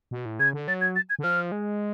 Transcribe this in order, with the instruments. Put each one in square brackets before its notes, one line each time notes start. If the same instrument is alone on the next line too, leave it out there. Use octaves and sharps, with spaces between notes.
[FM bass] B2
A2
[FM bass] C#3 [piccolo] G#6
[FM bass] D3
[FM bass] F#3 [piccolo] A6
[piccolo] G#6
A6
G#6
[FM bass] D3
[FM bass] F3 [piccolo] F6
[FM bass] G#3